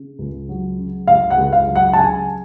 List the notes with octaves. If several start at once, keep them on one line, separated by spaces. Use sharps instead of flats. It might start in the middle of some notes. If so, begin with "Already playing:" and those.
Already playing: C#3
C#2
F#3
C#3
C#2 F5
F#5
C#2
F5
F#3
F#5
A5
C#3 G#5